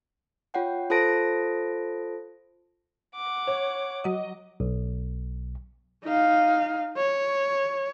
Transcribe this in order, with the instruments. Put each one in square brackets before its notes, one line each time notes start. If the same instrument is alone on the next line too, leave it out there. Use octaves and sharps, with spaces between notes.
[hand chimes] F4 C#5 F#5 G5
F4 A4 C5 A5 A#6 D7
[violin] F#5 D6
[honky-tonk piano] C#5
[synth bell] F#3 D#5
[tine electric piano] B1
[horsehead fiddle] D#4 F5
C#5